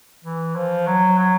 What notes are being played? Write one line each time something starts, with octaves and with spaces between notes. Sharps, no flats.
E3
F3
F#3
F#3